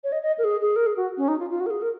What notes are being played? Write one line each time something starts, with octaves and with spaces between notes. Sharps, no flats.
C#5
D#5
D#5
A#4
G#4
G#4
A#4
G#4
F#4
C#4
D#4
F4
F4
F#4
A#4
G#4
A#4